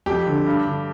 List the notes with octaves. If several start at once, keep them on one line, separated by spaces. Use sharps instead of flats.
F2 G4
D3
G2
D3